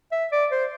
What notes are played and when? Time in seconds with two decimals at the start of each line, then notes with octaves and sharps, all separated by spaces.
0.12 E5
0.32 D5
0.51 C5